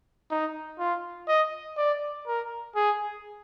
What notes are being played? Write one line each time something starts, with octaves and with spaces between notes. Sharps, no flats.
D#4
F4
D#5
D5
A#4
G#4